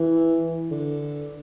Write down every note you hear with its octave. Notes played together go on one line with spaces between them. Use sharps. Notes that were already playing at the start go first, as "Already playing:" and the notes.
Already playing: E3
D3